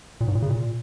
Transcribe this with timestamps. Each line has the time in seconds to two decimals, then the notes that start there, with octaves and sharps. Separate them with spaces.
0.21 A#2
0.28 G#2
0.35 A#2
0.42 C#3
0.50 A#2